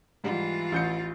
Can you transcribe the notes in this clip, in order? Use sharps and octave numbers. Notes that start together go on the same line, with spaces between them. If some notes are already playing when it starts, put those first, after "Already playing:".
G#2 E3 G3 F4
A1 G6 C#7